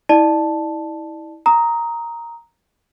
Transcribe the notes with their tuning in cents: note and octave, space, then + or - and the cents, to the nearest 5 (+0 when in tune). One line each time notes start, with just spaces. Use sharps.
E4 -30 D5 +30 A5 +0
A#5 +0 D#6 +20